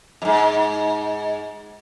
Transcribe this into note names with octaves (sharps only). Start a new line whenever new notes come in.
F2 G#2